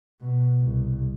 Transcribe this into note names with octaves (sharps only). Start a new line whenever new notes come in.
B2
C2